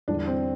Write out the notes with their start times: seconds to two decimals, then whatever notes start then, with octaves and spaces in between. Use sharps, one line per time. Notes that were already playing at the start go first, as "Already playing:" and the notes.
0.08 E2 D3 G3 D4
0.27 C4